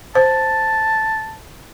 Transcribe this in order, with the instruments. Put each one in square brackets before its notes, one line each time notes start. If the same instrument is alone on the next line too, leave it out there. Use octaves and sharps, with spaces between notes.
[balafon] C5 [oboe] A5